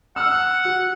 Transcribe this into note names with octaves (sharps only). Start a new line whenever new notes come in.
F#5 E6 F6
F#4